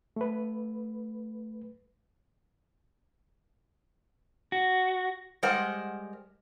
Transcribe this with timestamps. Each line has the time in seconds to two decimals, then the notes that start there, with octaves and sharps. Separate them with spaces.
0.16 A3 B4
4.52 F#4
5.43 G3 G#3 A#4 C5 D#5 F#5